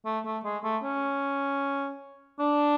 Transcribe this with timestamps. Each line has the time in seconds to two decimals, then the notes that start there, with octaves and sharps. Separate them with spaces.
0.06 A3
0.25 A3
0.45 G#3
0.64 A3
0.84 C#4
2.40 D4